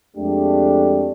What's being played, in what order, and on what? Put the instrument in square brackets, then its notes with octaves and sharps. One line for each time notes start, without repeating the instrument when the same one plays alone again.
[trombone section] F2 G#3 A3 D4 G4